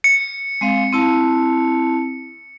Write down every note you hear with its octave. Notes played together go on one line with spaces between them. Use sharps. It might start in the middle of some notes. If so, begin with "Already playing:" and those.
C#7
G#3 C4 F5
C4 E4 A5